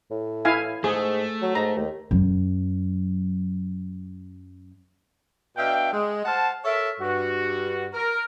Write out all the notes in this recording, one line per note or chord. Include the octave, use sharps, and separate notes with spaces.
A2
E4 F5 G#5
G#2 A3 G#4
F#3
G#2 A#5
D#2
F#2 F#3
B2 D4 E5 F5 G5
G#3
C5 F5 F#5 A5
A4 A#4 C#5 E5
G2 F#4
A#4